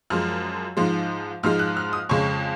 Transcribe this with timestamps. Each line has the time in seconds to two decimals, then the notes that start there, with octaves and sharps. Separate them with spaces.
0.10 F#2 F3 G#3 F6
0.77 G#2 F3 G#3
1.43 G#2 F3 G#3 F6
1.59 F#6
1.77 F6
1.93 D#6
2.09 F2 C#3 G#3 C#6